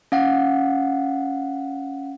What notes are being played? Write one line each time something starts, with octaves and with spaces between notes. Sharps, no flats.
C#4 F5 F#5